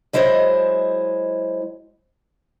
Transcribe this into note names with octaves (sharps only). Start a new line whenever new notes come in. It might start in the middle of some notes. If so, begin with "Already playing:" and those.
F#3 G#3 E4 C5 D#5